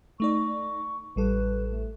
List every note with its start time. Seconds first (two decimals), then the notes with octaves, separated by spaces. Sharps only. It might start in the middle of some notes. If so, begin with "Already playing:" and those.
0.20 A3 D#4 D5 C#6
1.16 A1 G3 A4 B4
1.70 A3